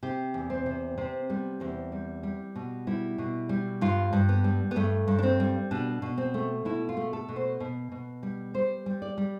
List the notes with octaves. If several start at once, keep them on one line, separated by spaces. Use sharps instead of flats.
C3 G4
E2
C4
C3
C3 C4
G3 B3
E2 C4
G3
G3
B2
G3 E4
B2
G3
G2 F4
G2
B3
G3
B3
G2 A3
G2
D4
C4
G3
B2 D4
B2
C4
A3
B2 E4
F4
A3
A4
B2
C5
B2
B2
G3
G3 C5
G3
D5
G3